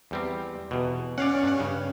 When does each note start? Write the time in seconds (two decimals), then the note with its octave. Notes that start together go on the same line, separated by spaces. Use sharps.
0.11 E2 G3 C4
0.71 E2 B2
1.18 C#4 D5 F5 F#5
1.43 G2 F#5
1.60 G2 C#3